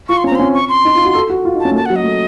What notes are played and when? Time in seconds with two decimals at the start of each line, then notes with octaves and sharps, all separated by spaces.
0.09 F4 C#6
0.17 C6
0.24 C#4 A#5
0.31 C4
0.35 C#4 C6
0.54 C#6
0.69 C6
0.85 D#4
0.95 F4
1.05 F#4
1.15 A4
1.30 F#4
1.45 F4
1.55 D#4
1.60 A5
1.65 C#4
1.71 A3
1.76 A#3 A5
1.85 F#5
1.90 F#3
1.96 D#5
2.04 A3